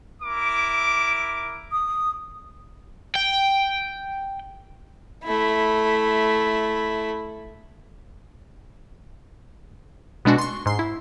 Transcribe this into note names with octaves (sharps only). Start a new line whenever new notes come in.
E4 A#4 D6
D#6
G5
A3 E4
B2 G#3 D4 F#4
C6 C#6
G#2 C6 C7
E4